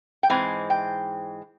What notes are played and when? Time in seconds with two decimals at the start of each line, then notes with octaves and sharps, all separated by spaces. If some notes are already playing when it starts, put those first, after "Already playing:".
0.23 G5
0.30 G#2 E3 G#3 C4 G#5
0.70 G5